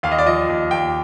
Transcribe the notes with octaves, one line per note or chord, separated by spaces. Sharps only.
D#2 F5
D#5
D5
F3 D#5
D#2
D#2 G5